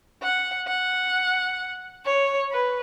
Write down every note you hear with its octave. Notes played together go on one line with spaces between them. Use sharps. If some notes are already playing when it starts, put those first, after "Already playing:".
F#5
F#5
C#5
B4